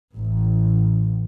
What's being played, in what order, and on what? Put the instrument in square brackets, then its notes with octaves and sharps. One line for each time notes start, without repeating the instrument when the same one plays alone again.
[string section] A1